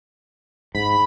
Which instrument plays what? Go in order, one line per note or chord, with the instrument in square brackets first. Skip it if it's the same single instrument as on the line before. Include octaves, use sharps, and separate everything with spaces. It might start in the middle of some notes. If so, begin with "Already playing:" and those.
[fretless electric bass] G#2 [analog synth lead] B5